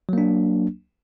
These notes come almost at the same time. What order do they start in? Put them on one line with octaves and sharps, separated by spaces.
F#3 A#3 D4